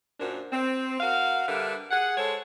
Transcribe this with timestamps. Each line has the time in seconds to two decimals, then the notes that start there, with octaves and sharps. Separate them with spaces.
0.19 F#2 A#2 D4 A#4 C5
0.53 C4
1.00 F#4 A#4 F5
1.48 D3 G3 A#4 B4 E5
1.91 G#4 F#5
2.17 G#3 A4 C5 C#5